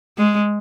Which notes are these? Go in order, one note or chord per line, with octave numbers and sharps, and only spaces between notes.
G#3